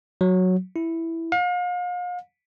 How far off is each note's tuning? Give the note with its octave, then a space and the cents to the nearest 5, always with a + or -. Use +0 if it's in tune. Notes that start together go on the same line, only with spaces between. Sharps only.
F#3 -5
E4 +0
F5 +40